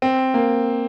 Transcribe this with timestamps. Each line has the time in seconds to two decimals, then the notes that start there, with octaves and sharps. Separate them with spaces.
0.02 C4
0.34 A#3